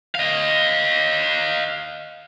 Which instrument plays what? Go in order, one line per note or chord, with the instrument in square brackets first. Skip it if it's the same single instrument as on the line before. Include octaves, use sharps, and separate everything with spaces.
[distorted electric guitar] D#5 F5